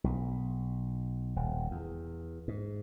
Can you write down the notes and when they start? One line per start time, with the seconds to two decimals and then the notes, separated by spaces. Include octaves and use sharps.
0.04 B1
1.36 D#1
1.71 E2
2.48 G#2